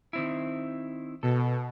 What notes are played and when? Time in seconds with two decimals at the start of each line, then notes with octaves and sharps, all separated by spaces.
0.13 D#3 C4 E4
1.23 B2 A4